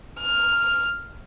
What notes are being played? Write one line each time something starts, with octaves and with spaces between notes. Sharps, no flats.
F6